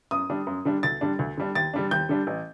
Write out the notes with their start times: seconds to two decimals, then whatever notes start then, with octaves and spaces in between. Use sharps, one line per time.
0.11 F#2 D#6
0.29 D3 G3 D4
0.47 F#2
0.65 D3 G3 D4
0.83 D2 A6
1.01 D3 G3 D4
1.19 D2
1.37 D3 G3 D4
1.55 D#2 A6
1.74 D3 G3 D4
1.91 D#2 G6
2.09 D3 G3 D4
2.27 A1